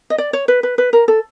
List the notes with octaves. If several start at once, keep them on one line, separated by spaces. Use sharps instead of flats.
D#5
D5
C#5
B4
B4
B4
A#4
A4